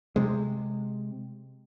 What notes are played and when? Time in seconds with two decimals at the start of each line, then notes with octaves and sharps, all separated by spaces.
0.16 C3 G#3